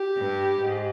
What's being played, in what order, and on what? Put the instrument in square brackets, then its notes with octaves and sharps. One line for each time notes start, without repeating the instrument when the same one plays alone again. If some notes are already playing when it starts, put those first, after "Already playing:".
Already playing: [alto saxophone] G4
[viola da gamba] G2
G#2